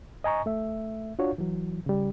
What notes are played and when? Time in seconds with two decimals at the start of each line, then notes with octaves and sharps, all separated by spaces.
0.24 D#5 G#5 A#5 C#6
0.46 A3 E5
1.19 D4 F4 F#4 C#5
1.38 E3 F#3
1.86 C#3 G3